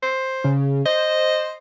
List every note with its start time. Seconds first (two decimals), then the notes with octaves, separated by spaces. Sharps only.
0.03 C5
0.44 C#3
0.86 C5 D#5